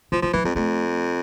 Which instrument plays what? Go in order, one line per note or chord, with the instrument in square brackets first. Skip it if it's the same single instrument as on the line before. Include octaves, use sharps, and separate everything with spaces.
[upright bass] D3 [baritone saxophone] F3
[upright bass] E3 [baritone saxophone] F3
[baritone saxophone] E3 [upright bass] F3
[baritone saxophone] F2 [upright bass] G#3
[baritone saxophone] F2 [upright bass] A3